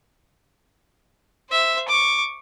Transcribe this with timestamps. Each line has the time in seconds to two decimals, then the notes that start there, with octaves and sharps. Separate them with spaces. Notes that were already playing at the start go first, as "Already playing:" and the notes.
1.50 C5 E5
1.89 C#6 D6